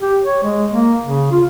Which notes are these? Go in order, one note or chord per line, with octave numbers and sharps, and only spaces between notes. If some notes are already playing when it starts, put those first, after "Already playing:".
G4
C#5
G#3
A#3
C#3
F4